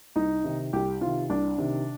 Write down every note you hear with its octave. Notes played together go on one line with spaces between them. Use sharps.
C2 D#4
C3 D#3
C2 G4
C3 D#3 F4
C2 D4
C3 D#3